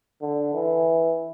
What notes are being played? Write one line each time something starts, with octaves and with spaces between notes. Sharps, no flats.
D3
E3